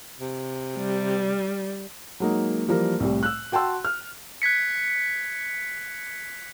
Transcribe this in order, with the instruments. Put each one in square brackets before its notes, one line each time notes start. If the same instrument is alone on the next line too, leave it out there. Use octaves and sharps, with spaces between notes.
[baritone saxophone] C3
[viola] G3
[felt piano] F#3 G#3 A#3 D#4
E3 F3 G3 A#3 A#4
C2 A2 G3
E6 F#6
F#4 G5 A5 C6 E6
F6
[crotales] F#6 G#6 B6 C#7